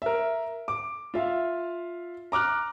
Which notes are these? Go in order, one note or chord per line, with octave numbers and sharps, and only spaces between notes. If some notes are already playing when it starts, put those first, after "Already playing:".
A#4 E5
D6
F4 E5 F5
A#5 D6 F6 F#6